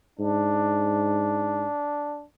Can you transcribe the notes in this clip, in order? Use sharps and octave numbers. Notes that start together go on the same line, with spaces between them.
G#2 D4